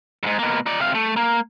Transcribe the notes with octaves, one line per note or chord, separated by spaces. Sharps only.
F2 G#2
B2 A#3
D#4 D5
C3 F5
A3
A#3